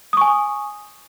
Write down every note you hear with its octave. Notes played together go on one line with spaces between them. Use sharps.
G#5 C#6 D#6